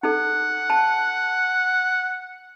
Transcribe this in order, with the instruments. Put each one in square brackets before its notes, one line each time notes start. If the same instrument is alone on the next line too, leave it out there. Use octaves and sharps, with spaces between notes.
[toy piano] D#4 A4 [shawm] F#5
[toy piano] A5